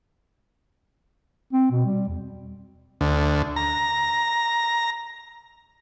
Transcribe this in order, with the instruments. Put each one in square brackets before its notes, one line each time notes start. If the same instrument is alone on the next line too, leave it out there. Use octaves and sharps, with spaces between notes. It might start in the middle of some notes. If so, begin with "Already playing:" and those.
[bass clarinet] C4
B2
G3
E2
[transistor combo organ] D2
A#5